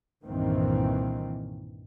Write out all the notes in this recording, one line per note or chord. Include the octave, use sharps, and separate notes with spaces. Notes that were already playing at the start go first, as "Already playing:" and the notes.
C2 G2 A#2 D#3 E3 C4